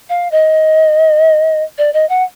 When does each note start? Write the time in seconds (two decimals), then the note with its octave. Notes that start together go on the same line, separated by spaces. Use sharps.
0.09 F5
0.32 D#5
1.78 D5
1.94 D#5
2.09 F#5